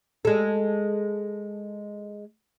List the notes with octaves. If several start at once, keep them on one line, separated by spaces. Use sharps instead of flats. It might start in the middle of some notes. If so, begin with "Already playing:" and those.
G#3 A4